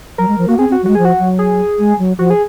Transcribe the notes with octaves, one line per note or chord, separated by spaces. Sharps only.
F#3 A#4
G#3
F3
A#3 F#4
C4 G#4
C4
F#4
F#3
G#3 F#4
F3 G#4
F#4
F#3
G#4
G#3
F#3
F3 F#4
G#4